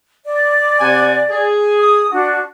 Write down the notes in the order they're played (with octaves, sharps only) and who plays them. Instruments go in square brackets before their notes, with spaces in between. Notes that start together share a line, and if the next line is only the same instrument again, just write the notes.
[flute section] D5
[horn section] C3 F#5 G#5
G#4
[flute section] D#6
D4 F#4